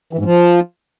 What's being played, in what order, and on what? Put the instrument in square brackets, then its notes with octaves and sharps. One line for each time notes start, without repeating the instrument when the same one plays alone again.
[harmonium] E3
G#2
F3